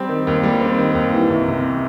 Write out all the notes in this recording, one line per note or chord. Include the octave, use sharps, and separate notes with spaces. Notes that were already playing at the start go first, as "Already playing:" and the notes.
Already playing: G3 C4
D#3
D#2
G3
C4
D#3
D#2
E3
C2
C3